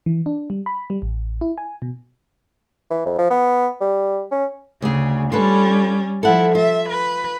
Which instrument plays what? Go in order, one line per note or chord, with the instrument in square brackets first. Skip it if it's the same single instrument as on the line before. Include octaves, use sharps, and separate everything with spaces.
[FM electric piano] E3
D4
G3
B5
G3
A1
E4
G#5
B2
[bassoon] E3
F2
F3
B3
G3
C#4
[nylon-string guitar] D2 G#4 [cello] C#3
[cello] G3 C#4 [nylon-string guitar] F4 A4 B4
[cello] F3 E4 [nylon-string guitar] A4 F#5
[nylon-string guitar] F4 [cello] E5
[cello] B4